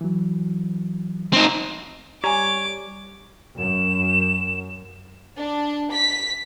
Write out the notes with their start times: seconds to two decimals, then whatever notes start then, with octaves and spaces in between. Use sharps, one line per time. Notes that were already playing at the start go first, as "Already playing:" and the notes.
0.01 E3 F#3
1.33 C4 D#4
2.24 G3 C#5 G#5 A#5 D6
3.58 F#2 E7
5.36 D4
5.92 B6